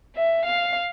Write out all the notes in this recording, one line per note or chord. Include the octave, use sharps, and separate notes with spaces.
E5
F5